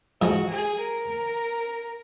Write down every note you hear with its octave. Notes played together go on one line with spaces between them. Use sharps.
G#2 F3 G#3 F#4
G#4
A#4